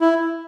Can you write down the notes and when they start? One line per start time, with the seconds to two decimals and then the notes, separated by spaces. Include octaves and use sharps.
0.01 E4